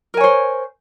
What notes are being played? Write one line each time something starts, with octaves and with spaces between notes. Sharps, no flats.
A#4 C5 C#5 G#5